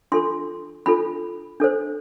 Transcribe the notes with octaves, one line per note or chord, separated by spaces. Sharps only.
D4 F4 A4 C6
D4 F4 A4 B5
D4 A4 C5